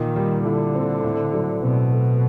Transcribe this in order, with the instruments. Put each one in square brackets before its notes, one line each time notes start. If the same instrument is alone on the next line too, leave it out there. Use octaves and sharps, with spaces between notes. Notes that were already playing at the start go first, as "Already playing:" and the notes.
Already playing: [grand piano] A#2 [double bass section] D#3
[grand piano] G3
[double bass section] D3 [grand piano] E4
[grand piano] C4
A2
F#3
[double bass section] B2 [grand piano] C4
[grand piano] A3